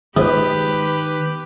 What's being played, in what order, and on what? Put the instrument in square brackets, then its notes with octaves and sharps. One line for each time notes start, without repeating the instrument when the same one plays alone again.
[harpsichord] G#2 [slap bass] D#3 [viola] G4 B4